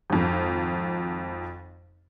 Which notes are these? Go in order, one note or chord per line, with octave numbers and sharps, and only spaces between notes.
G#1 F2